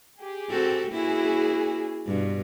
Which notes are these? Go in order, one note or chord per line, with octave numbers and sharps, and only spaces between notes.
G4 G#4
C4 F#4 A4
A#3 C#4 E4 F#4 G#4
G2 B2